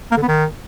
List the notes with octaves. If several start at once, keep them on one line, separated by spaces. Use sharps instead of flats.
A#3
D3
B3
D#3